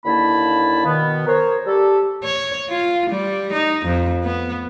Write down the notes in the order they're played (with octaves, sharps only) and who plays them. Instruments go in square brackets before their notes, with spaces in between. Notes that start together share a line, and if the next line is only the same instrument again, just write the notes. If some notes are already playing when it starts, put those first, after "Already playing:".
[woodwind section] D#2 D3 A#3 E4 A5 B5
B2 D#3 B3
A#4 C5 C#5
G3 G4 A4
[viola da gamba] C#5
F4
G3
D#4
F2
B3